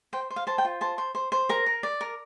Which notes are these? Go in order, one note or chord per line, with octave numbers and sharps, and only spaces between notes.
C5 G5
C5
F5
C5 A5
G5
F4
C5 A5
C5
C5
C5
A#4 A#5
A#4
D5
A#4